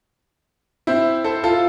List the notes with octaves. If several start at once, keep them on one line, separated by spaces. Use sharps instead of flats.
C4 E4
A4 C5
F4 A4